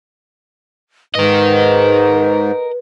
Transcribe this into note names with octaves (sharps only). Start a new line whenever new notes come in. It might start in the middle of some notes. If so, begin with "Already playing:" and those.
G#2 A#4 B4 D#5